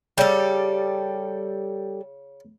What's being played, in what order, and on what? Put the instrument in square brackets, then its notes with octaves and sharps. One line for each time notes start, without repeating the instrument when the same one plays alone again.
[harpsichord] C#3 [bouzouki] G3 A4